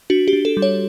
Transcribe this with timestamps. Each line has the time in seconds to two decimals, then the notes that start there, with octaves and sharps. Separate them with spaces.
0.10 D4 F#4
0.28 G4
0.33 D4
0.45 A4
0.57 G3
0.62 C#5